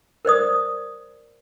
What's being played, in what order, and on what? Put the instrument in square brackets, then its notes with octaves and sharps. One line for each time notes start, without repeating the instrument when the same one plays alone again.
[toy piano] A#4 C5 D5 D#6